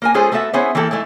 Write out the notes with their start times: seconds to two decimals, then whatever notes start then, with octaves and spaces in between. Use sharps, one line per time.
0.02 A#3 A#4 G#5
0.14 G#3 C#4 F4 G#4 A4 C5
0.32 A3 B3 F#4 A4 E5
0.53 B3 C#4 E4 G#4 C5 E5
0.75 E3 A#3 E4 G4 A4
0.91 G#3 A3 D#4 E4